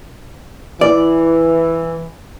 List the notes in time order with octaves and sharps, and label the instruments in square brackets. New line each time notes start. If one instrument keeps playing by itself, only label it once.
[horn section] E3 [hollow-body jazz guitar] D5